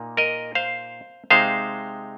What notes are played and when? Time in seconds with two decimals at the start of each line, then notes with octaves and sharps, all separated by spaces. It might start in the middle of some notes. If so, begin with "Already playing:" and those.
Already playing: A#2 A#3 D#4
0.17 A#4 D#5
0.55 C5 F5
1.30 C3 G#3 D#4 C5 F5